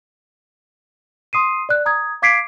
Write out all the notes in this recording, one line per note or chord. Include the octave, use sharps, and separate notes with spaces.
C6 D#6 C7 D#7
D5 F#6
A#5 D#6 G#6
F5 D6 G#6 B6 C7 D7